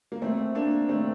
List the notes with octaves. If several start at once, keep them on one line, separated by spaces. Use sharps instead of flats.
A#3
A3 C4
A#3 D4
A3 C4